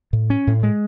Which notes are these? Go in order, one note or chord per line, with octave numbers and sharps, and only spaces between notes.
A2
C#4
A2
G#3